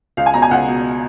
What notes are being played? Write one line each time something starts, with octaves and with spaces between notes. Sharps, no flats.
C#2 F5
G#5
B2 A#5
G#5
C#2 F#5
B2